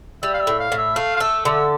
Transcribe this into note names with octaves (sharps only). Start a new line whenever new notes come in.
G3 E5
F5
E5
A2
F5
A2
E5
A3 F5
F5
A4 E5
D3 E5